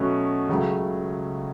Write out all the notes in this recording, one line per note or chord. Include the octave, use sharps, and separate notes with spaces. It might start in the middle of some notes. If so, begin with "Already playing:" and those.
Already playing: B2 F#3 A3 C#4 F#4
C#2 C#3 F#3 A3